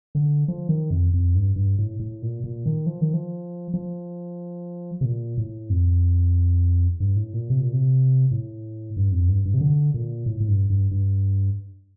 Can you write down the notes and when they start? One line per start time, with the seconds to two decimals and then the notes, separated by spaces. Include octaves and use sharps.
0.15 D3
0.48 F3
0.69 D#3
0.91 F2
1.14 F2
1.35 G2
1.56 G2
1.78 A2
1.99 A2
2.22 A#2
2.44 A#2
2.66 D#3
2.86 F3
3.01 D#3
3.14 F3
3.74 F3
5.01 C3
5.05 A#2
5.38 A2
5.70 F2
7.00 G2
7.16 A2
7.33 A#2
7.50 C3
7.61 A#2
7.73 C3
8.31 A2
8.97 G2
9.12 F2
9.28 G2
9.45 G2
9.54 C3
9.61 D3
9.94 A#2
10.26 A2
10.40 A2
10.48 G2
10.70 G2
10.91 G2